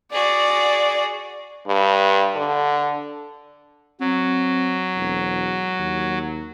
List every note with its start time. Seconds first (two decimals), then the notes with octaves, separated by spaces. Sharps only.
0.12 F#4 G#4 D5
1.67 G2
2.36 D3
4.01 F#3 C4
4.96 E1
5.79 D#2